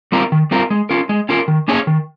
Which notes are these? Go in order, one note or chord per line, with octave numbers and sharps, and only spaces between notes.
G3 C4 F4 A#4
D#3
G3 C4 F4 A#4
G#3
C#4 F4 A#4
G#3
C#4 F4 A#4
D#3
A#3 C#4 G#4 C#5
D#3